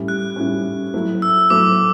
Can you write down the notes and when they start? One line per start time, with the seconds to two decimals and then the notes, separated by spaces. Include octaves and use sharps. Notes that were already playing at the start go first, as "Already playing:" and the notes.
Already playing: A2 G3 C#4
0.08 F#6
0.36 A2 G3 C#4
0.94 F#3 A3 E4
1.22 E6
1.50 F#3 A3 E4 D6